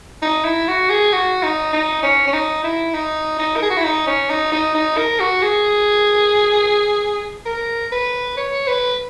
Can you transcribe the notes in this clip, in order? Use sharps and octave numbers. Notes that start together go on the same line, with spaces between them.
D#4
E4
F#4
G#4
F#4
D#4
D#4
C#4
C#4
D#4
E4
D#4
D#4
A#4
G#4
F#4
E4
D#4
C#4
D#4
D#4
D#4
A#4
F#4
G#4
A#4
B4
C#5
B4